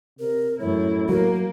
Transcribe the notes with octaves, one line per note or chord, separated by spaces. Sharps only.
C3 A#4
F#2 A2 E4 C#5
F#3 A#3 A#4